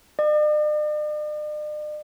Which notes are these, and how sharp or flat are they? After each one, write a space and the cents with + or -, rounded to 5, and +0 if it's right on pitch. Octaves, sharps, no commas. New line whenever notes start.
D5 +45